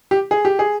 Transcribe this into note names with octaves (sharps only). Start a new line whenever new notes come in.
G4
G#4
G4
G#4